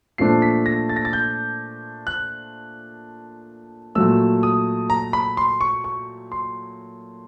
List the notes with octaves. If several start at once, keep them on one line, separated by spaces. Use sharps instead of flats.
A#2 F3 A3 D4 C7
B6
A#6
A6
A#6
A6
G6
F#6
A#2 F#3 A3 E6
D#6
A#5
B5
C6
C#6
C#6
C6